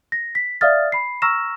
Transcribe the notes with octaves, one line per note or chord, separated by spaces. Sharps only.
A#6
B6
D5 E5 F5 D#6 F6 A6
B5 C7
A#5 C#6 E6 F6 A#6 E7